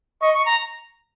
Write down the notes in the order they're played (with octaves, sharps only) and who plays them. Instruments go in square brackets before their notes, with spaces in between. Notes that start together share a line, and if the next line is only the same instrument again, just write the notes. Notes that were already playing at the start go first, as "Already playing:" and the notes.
[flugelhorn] D#5 [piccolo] C#6
[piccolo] C#6
A#5